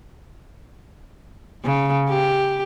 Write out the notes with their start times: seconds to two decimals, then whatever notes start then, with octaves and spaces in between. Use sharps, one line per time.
1.65 C#3
2.09 G4